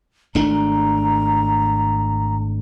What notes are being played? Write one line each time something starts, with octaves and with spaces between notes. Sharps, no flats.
G#1 A3 D4 A#5